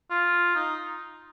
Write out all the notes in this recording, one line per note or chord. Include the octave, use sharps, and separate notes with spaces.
F4
D#4